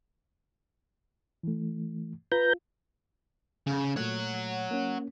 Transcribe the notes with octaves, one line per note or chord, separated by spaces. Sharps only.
E3 A3
F4 B4 A#5 G6
C#3
A#2 A3 C#5 F#5
A#3 C#4